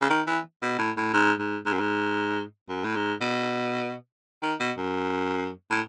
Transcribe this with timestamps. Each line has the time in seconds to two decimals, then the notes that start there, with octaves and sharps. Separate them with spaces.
0.01 C#3
0.10 D#3
0.27 E3
0.62 B2
0.79 A2
0.97 A2
1.14 G#2
1.39 G#2
1.66 G#2
1.73 F#2
1.80 G#2
2.69 F#2
2.84 A2
2.96 G#2
3.21 B2
4.43 D#3
4.60 B2
4.77 F#2
5.70 A2